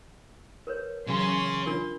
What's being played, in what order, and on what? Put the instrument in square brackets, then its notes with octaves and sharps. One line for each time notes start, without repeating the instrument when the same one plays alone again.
[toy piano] A#4 B4 C#5
[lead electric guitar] C#3 G#4 [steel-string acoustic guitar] E3 F#3 [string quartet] C6
[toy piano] D4 F4 A#4